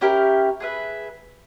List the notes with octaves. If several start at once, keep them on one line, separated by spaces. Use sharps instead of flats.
C#4 E4 G4 A#4
G#4 B4 E5